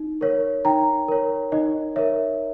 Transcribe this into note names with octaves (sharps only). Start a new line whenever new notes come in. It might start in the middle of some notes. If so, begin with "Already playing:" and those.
Already playing: D#4
A#4 C#5
D#4 G5 A#5
A#4 C#5
D#4 D#5
A#4 C#5 E5